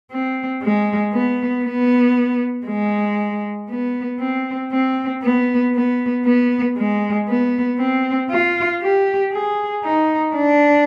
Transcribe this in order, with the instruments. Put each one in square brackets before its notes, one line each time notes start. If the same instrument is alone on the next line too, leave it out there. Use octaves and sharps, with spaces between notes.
[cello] C4
G#3
B3
B3
G#3
B3
C4
C4
B3
B3
B3
G#3
B3
C4
F4
G4
G#4
D#4
D4